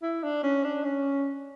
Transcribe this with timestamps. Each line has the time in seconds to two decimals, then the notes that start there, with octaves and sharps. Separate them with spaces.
0.02 E4
0.23 D4
0.43 C#4
0.64 D4
0.84 C#4